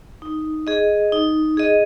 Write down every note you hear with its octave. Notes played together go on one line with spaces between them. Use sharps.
D#4
G#4 D#5
D#4
G#4 D#5